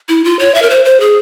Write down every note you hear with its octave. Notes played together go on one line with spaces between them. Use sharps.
E4
F4
C#5
E5
A#4
C5
C5
G#4